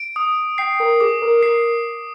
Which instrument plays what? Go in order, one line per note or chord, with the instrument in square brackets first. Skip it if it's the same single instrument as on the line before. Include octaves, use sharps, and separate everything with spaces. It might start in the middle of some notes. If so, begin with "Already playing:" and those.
Already playing: [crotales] D7
D#6
[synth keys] G5 [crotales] C7
[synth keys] A#4
[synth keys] G#4 [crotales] D6
[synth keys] A#4
[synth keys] A#4 [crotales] C7